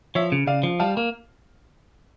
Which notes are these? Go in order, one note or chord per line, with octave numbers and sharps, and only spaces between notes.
F3 C#5 E5
C#3
C#3 D5 F5
F3
G3 F5 A5
A#3